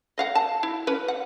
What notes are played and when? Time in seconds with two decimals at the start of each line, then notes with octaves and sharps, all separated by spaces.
0.18 D#5 F5 F#5
0.35 A5
0.63 E4
0.87 C#4 B4
1.08 F#5